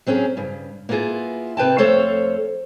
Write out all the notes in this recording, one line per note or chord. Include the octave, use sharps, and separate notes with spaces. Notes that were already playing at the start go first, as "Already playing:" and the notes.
F#3 C4 C#4 F4 G#4
G2 C#3
A#3 B3 E4 F4 G#4
C3 B4 G5 A5
F2 A3 A4 C5 C#5 F5